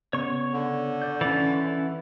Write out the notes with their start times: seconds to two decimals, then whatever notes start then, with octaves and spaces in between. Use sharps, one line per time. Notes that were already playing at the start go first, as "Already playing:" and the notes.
0.13 C#3 B3 C#5 C#6
0.53 D3
1.02 D5 G6
1.21 E3 C#4 A6